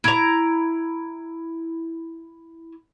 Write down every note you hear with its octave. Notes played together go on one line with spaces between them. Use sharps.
E4 A#5